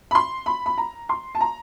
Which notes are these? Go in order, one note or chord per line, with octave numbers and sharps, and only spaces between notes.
B5
C6
B5
B5
A#5
C6
A5
A#5